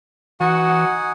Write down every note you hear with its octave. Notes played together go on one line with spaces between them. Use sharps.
E3 D#4 F#4 F#5 G#5